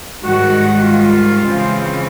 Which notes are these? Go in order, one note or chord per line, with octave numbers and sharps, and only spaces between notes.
G#2 D#3 G3 F#4
F4
C#3 E3 G#3 C4